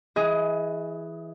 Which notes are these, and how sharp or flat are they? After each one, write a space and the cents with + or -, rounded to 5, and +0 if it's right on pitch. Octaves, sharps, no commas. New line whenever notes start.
E3 +0 G#4 +0 D#5 +25